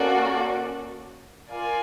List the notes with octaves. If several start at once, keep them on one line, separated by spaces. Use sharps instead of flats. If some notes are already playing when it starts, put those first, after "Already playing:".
Already playing: A#3 C#4 F#4 A4 D5
F4 A#4 D5 F5 G#5